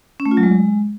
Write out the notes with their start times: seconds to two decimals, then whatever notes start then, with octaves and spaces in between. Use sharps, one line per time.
0.20 C#4
0.26 A3
0.31 F4
0.37 F#3
0.43 G#3